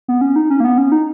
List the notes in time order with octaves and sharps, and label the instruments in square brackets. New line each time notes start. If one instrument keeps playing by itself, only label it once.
[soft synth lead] B3
C#4
D#4
C#4
A#3
B3
C#4
D#4